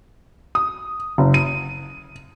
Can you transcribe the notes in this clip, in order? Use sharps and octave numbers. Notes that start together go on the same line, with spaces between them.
D#6
F#1
D#7